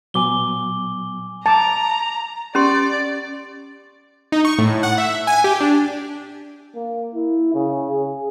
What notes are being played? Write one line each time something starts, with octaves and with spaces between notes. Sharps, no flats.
A#2 F#3 B3 G#5 D6 G7
A5 A#5 D6
C#4 G4 D5 C6
D#4
C#6
A2
F#5
E5
G#5
G4
D4
A#3
E4
C#3
G#4